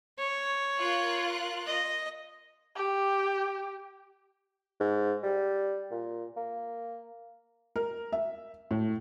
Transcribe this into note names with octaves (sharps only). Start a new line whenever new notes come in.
C#5
F4 A#4 F#6
D#5
G4
G#2
G3
A#2
A#3
A#4
E5
A2